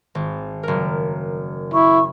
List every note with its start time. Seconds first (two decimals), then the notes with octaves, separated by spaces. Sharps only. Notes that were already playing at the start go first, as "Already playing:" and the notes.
0.15 G#1
0.63 F#1 A#4
1.74 E4 C#6